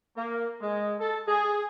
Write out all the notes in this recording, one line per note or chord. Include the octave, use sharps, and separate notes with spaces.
A#3
G#3
A4
G#4